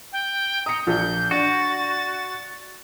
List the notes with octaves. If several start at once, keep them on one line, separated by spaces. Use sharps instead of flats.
G5
A#5 D#6 C#7
A#1 G6
D4 F#4 A6